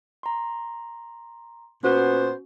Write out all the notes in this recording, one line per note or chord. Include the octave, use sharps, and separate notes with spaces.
A#5 C6
A#2 B3 C#4 F#4 C5